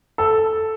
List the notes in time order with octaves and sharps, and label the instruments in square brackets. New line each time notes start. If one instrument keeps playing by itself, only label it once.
[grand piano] A4